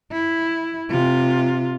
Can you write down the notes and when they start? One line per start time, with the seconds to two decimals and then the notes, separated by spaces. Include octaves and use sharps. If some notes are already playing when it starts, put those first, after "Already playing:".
0.12 E4
0.91 C3 F4